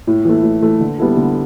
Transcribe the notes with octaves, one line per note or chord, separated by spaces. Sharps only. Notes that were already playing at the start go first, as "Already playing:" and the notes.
A2
E3 A3
A2
E3 A3
D3
G3 B3 E4 A4
D3